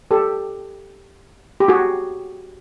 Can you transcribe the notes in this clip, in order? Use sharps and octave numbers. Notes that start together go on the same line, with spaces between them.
G4 A4
G4
F#4 G#4